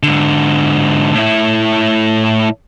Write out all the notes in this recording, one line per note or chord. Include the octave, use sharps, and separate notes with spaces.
G#2 D3
A2 E4